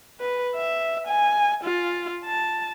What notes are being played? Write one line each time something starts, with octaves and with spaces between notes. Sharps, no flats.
B4
E5
G#5
F4
A5